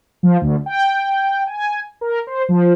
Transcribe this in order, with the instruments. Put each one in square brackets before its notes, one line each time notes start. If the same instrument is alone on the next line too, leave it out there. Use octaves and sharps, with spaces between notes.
[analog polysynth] F3
D2
G5
G#5
A#4
C5
F3